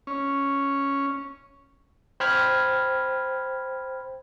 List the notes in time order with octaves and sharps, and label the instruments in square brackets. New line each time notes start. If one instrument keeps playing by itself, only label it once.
[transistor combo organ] C#4
[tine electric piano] C5 G5 B5 F6 G#6